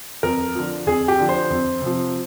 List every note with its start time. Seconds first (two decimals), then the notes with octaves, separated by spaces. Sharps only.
0.23 F2 A#4
0.55 D3 F3
0.86 F2 G#4
1.08 G4
1.18 D3 F3
1.29 C5
1.50 F2
1.82 C3 F3